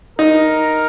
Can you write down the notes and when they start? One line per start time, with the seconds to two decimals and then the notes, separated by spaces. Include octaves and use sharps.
0.19 D#4 A#4